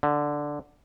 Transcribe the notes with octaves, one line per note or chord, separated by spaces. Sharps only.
D3